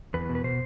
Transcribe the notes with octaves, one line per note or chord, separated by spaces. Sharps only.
E2 B4
B2
B4
B2 C5